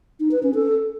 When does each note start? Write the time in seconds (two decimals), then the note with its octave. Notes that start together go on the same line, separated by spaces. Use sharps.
0.20 D#4
0.31 B4
0.43 C#4
0.55 A4